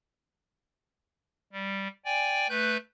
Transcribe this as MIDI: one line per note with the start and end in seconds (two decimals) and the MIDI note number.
1.52 1.88 55
2.05 2.47 74
2.05 2.47 79
2.05 2.47 80
2.49 2.77 57
2.49 2.77 71
2.49 2.77 90
2.49 2.77 91